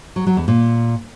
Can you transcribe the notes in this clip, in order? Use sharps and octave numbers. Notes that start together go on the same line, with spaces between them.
F#3
F#3
E2
A#2